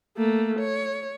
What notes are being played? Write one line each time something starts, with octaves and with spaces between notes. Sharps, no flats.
A3 A#3
C#5